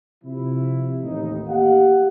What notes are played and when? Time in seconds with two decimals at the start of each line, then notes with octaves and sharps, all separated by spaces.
0.24 C3 F3 E4
1.02 A1 D#2 A3 D#4
1.47 A#3 G4 F5 F#5